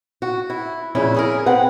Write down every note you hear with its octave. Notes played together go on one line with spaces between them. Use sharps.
F#4
E4
F2 A#2 C#3 C#4 E4
C#4 G#4 A#4
C4 B4 F#5